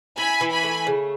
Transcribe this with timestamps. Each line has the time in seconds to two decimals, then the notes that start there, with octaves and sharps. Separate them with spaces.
0.17 E4 G#5 B5
0.41 E3
0.52 G#5 B5
0.63 A3
0.87 C#3